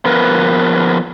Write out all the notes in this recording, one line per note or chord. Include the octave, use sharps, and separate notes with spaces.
F3 B3 A#4 B4